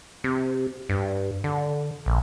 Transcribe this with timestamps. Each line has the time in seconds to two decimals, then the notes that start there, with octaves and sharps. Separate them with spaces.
0.24 C3
0.89 G2
1.44 D3
2.06 A#1